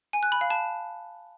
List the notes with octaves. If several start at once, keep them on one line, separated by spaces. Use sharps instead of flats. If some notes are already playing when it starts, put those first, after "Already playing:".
G#5
F#6
B5
F5
A5